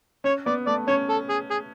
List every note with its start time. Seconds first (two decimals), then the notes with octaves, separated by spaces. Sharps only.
0.24 C#4 C#5
0.46 B3 D5
0.67 A3 D5
0.88 C#4 C#5
1.09 A4
1.29 G#4
1.51 G#4